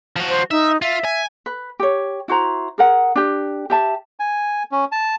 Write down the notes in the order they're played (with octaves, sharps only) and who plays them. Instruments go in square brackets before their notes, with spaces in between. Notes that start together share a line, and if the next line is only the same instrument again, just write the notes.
[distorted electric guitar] F3 F#4
[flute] C5
[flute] D#4 [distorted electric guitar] E5
[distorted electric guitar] F4 [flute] E5
[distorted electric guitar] G#5
[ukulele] B4
G4 C#5
E4 F#4 C5 A#5
G#4 A#4 F#5
D4 G4
G4 E5 A5
[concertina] G#5
C#4
A5